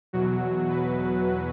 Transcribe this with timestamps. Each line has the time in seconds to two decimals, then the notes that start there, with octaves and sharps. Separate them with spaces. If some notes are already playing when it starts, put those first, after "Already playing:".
0.13 E2 B2 F#3 F#4
0.69 B4